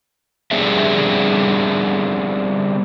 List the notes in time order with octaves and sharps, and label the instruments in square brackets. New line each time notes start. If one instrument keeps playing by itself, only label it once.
[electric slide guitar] G3 B3 C4 D4 G#4 E5